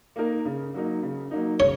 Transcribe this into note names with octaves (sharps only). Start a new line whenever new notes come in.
A#3 D#4 A#4
C#3
F#3 A#3 D#4
C#3
F#3 A#3 D#4
C#3 C#5